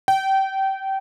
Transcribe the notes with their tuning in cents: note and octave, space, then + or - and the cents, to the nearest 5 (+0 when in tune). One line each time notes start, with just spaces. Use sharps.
G5 -25